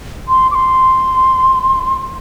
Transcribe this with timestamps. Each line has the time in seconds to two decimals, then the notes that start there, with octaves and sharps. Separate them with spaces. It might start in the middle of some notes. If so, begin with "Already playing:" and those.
0.28 C6
0.51 D6
0.55 C6